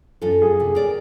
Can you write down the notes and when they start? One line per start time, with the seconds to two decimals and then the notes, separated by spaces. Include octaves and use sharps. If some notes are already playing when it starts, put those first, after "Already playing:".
0.22 F#2 F4 A4
0.42 G#4
0.60 C3
0.75 A#4 D5